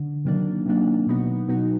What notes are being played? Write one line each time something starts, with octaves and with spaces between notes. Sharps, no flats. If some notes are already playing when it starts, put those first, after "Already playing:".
Already playing: D3
C3 D#3 F#3 A#3 D4
C3 D#3 F#3 A#3 D4
B2 F#3 B3 D#4 F#4
B2 F#3 B3 D#4 F#4